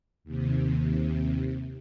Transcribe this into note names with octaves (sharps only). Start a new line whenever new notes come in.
D#2 C3